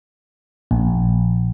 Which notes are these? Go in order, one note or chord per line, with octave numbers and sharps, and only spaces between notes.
A#1